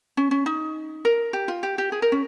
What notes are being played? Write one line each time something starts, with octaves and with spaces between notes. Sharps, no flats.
C#4
C#4
D#4
A#4
G4
F4
G4
G4
G#4
A#4
C#4